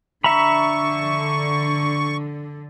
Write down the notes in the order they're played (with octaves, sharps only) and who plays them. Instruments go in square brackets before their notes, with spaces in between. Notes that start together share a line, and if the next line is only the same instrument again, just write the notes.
[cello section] D3 [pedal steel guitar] E5 A#5 B5 [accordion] C#6